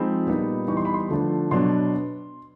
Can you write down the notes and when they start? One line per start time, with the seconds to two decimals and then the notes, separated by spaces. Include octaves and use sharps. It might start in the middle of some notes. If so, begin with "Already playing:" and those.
Already playing: F3 G#3 C4 D#4 B5
0.27 A#2 G3 B3 D#4
0.67 E3 G3 B3 D#4 C#6
0.77 C6
0.85 B5
0.94 C6
1.09 D3 F3 A3 D4
1.51 B2 F#3 B3 D4 C6